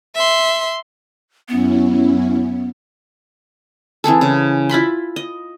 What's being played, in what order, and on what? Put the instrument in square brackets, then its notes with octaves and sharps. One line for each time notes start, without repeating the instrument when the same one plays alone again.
[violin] E5 C6
[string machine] F#2 C#4 E4 [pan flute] B3
[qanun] E3 C4 G#4 A4
C#3
E4 F4 B5 C6
D#5